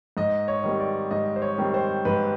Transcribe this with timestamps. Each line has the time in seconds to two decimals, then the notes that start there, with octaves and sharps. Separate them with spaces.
0.17 G#2 D#5
0.48 C#5
0.64 D#3 G3 C4
0.79 D5
1.11 G#2 D#5
1.36 C5
1.42 C#5
1.58 D#3 G3 C4
1.74 C5
2.05 G#2 B4